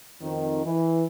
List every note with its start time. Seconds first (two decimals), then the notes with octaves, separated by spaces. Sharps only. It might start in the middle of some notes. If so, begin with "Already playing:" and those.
0.21 F2 D#3
0.65 E3